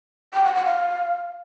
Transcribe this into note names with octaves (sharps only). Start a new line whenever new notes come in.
G5
F#5
F#5
F5